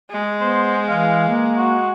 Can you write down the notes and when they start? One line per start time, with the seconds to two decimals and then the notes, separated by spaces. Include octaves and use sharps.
0.11 G#3
0.41 B3 C5
0.88 E3 F5
1.29 A#3
1.58 F#4